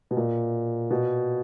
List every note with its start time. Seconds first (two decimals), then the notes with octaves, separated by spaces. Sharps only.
0.11 B2
0.17 A#2
0.91 B2